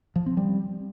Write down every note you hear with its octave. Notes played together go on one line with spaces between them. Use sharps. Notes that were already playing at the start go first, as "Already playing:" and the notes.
F3
C4
G3